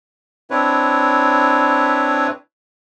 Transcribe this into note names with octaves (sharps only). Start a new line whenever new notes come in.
C4 D4 E4 B4 C#5